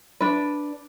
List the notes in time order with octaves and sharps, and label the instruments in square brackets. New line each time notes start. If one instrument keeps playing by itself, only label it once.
[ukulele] D4 B4